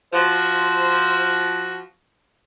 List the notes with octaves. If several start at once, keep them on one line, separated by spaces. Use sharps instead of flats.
F3 F#4 C5